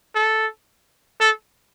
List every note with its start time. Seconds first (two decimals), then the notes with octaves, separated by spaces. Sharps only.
0.15 A4
1.20 A4